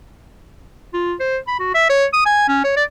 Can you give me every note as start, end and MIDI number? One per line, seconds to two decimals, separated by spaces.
0.94 1.14 65
1.20 1.37 72
1.48 1.60 83
1.60 1.70 66
1.75 1.87 76
1.90 2.05 73
2.13 2.24 87
2.26 2.47 80
2.48 2.64 61
2.64 2.73 73
2.77 2.84 74